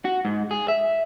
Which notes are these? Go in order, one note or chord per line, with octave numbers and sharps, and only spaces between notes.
F#4
G#2
G#4
E5